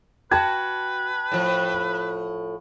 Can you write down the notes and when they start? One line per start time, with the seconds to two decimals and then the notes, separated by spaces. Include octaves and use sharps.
0.31 F#4 B4 G5 A5 G#6
1.32 A2 F3